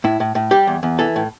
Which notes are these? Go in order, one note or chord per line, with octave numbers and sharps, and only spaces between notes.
A2 E4
A2
A2
G3 G4
E2
E2
E3 A4
A2